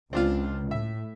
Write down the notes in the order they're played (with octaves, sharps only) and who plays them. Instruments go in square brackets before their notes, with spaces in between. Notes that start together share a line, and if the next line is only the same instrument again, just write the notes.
[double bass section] C#2 [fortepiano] C4 D4 F4
[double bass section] A2 [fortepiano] E5